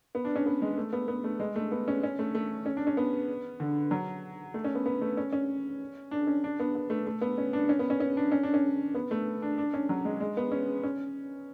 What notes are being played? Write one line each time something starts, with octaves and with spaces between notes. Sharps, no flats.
B3
D4
C#4
B3
G#3
A3
B3
B3
A3
G#3
A3
B3
C#4
C#4
A3
A3
C#4
D4
C#4
B3
D3
F#3
A3
C#4
B3
B3
A3
C#4
C#4
D4
C#4
D4
B3
B3
A3
A3
B3
C#4
D4
C#4
B3
C#4
C#4
D4
C#4
D4
C#4
B3
A3
D4
D4
C#4
F#3
G#3
G#3
B3
C#4
C#4